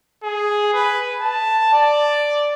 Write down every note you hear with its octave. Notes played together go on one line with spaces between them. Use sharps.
G#4
B4
A5
D5